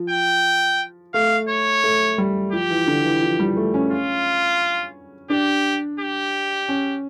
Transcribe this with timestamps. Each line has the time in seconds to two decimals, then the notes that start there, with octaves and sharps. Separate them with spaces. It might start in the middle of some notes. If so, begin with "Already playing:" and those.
Already playing: F3
0.10 G5
1.14 A3 F5
1.49 C#5
1.84 A3
2.18 G3
2.52 F3 G4
2.70 E3
2.87 D3
3.05 E3
3.22 F3
3.39 G3
3.57 A3
3.74 C#4
3.91 F4
5.30 D4 G4
6.00 G4
6.69 C#4